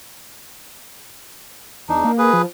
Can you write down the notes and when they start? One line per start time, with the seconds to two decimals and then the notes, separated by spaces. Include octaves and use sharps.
1.89 E2 D4 D#4
2.05 A#3
2.18 G#4 B4
2.33 F3